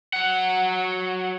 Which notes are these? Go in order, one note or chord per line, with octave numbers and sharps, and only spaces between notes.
F#3 F#5